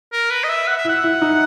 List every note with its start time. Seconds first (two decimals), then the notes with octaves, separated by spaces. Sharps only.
0.13 A#4
0.31 B4
0.44 D#5
0.49 E5
0.67 F#5
0.78 E5
0.85 E4 F#5
1.04 E4
1.22 D#4